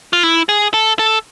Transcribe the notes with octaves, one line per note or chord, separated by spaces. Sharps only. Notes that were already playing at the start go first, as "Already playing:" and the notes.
F4
E4
G#4
A4
A4